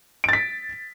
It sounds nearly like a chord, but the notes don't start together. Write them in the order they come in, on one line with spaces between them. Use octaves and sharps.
D7 A6 B6